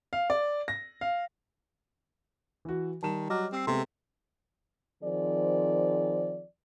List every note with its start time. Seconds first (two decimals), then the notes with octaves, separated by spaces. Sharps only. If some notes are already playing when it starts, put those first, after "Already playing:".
0.13 F5
0.30 D5
0.68 A#6
1.01 F5
2.65 E3 F#4
3.03 D#3 G3 A5 E7
3.30 F#3 D#5 D6 F6
3.52 C4 G4 E6 C7
3.67 C3 G#3 B3 A4 C6
5.04 D#3 F3 C4 G#4 D5